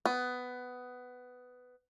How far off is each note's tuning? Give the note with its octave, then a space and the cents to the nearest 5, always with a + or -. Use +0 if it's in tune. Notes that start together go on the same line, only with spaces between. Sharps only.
B3 +15